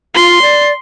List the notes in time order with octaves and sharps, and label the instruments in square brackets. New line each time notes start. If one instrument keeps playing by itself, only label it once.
[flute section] F4 [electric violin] C6
[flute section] D5